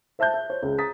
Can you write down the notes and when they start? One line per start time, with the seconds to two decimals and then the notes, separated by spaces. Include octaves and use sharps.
0.19 C5 E5 A5 F#6 G6
0.34 E5
0.50 C5 C#5
0.63 C#2
0.79 A#5 D#6 A6 B6